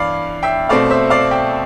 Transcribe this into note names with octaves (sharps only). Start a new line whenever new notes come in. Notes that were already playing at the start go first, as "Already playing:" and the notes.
Already playing: G2 E3 D5 F5
E5 G5
B2 A3 C4 D5 F5
C5 E5
D5 F5
E5 G5